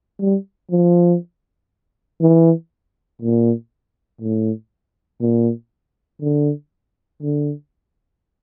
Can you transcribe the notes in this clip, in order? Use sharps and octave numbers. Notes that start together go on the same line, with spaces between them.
G3
F3
E3
A#2
A2
A#2
D3
D3